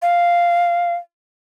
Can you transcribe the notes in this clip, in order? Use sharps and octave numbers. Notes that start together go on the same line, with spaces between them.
F5